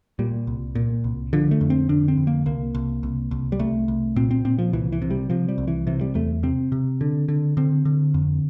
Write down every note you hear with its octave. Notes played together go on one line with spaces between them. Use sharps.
A#2 G3
C2
A#2
C2
D3 F3
A3
F2
C4
D3 D4
C4
F2
A#3
C2 A#3
C2
C2
C2
G3
C2 A3
C2
A#2 C4
C4
A#2 C4
F3
C2 E3
E3
C3
G3
C3 F3
G3
C2
E3
C3 E3
G3
E2 A3
C3 C4
C3
D3
D3
D3 C4
D3
F2